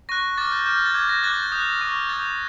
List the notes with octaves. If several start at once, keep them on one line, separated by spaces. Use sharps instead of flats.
C#6 F#6 A#6
D6 F6 A6
G6
D6 F6 G6
A6
D6 G6 G#6
A#6
D6 F#6 A6
G6
D#6 F#6
C#6 F6
D#6 G6 A6